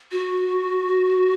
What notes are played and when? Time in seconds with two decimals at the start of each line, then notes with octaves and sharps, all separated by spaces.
0.12 F#4